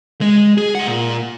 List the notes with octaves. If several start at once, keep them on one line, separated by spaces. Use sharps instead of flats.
G#3
G#4
G#4 F#5
A#2